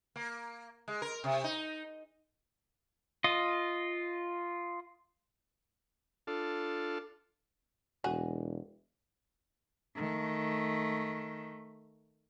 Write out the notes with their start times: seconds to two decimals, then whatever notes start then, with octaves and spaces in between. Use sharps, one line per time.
0.16 A#3
0.88 G#3
1.02 A#4
1.24 C3
1.44 D#4
3.24 F4 D#5
6.27 D4 F4 A4
8.04 E1 F#4 G#4
9.96 D#3 A3